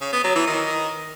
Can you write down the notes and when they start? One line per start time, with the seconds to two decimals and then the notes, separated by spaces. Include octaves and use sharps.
0.01 C#3
0.13 B3
0.24 F#3
0.35 E3
0.47 D#3